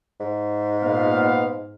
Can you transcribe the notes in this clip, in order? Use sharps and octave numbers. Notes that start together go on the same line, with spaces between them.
G#2
A#2 B3 F5